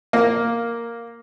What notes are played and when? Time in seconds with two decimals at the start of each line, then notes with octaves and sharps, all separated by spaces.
0.13 A#3